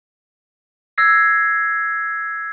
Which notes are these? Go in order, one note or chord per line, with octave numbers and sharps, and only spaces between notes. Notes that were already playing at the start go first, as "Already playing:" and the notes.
E6 G#6 A#6 C7